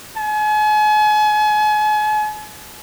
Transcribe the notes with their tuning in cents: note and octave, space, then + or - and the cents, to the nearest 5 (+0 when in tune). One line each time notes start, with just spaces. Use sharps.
G#5 +40